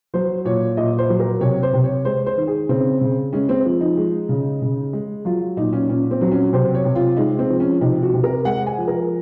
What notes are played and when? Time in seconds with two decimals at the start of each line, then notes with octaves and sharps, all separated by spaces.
0.14 F#3 C5
0.45 A#2 C#5
0.77 A#2 D#5
0.98 C5
1.09 F#3
1.20 A#4
1.41 C3 C#5
1.63 C5
1.74 C3
1.84 C#5
2.05 G#3 C5
2.26 C5
2.37 D#3
2.47 G#4
2.69 C#3 C4
3.01 C#3
3.33 G#3 C#4
3.49 C4
3.65 F3
3.81 D#4
3.97 G#3
4.29 C#3
4.62 C#3
4.93 G#3
5.25 F#3 F4
5.57 A#2 D#4
5.73 C#4
5.89 A#2 C#4
6.11 C4
6.21 F#3
6.31 C#4
6.53 C3 C5
6.75 C#5
6.85 C3
6.96 F4
7.17 G#3 D#4
7.39 C4
7.50 F3
7.60 C#4
7.81 C3 D#4
8.02 F#4
8.14 C3
8.24 A#4
8.45 G#3 F#5
8.66 G#5
8.77 F3
8.88 A#4